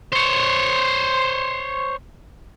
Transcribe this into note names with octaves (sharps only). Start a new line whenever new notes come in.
C5 C#5